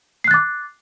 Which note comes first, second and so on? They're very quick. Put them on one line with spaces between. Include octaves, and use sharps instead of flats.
C7 F#6 A6 D6